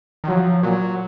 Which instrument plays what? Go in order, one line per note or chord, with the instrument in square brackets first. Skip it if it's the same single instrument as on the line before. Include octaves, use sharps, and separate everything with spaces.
[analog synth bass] D#3
[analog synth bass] F3 [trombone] F#3
[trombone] A#2 [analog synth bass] F#3